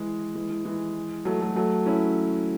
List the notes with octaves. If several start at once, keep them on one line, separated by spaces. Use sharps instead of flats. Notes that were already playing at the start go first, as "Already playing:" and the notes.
Already playing: E3 G#3
E3 G#3
E3
E3 G#3
F#3 A3
F#3 A3
F#3 A3
C#4 E4